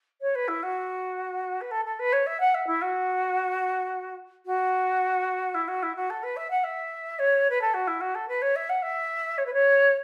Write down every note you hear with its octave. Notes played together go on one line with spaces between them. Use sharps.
C#5
B4
E4
F#4
B4
A4
A4
B4
C#5
E5
F#5
E5
E4
F#4
F#4
E4
F#4
E4
F#4
A4
B4
E5
F#5
E5
C#5
B4
A4
F#4
E4
F#4
A4
B4
C#5
E5
F#5
E5
C#5
B4
C#5